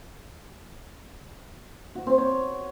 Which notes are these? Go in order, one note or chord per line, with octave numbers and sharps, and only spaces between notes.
F#4
C4
C#5